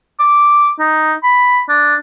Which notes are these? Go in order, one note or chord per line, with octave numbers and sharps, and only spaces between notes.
D6
D#4
B5
D4